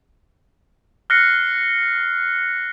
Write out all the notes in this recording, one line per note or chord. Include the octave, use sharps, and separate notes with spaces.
F6 F#6 A#6 C7 C#7